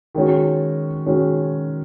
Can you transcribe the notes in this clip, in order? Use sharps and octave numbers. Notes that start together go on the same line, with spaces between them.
D#3 G#3 C#4 F#4
D#3 G#3 C#4 F#4